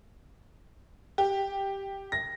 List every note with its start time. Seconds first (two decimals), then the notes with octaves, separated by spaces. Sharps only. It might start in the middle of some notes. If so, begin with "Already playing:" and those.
1.18 G4
2.12 A#6